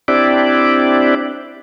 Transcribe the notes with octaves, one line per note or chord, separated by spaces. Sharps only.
C4 D4 E4 G4 D5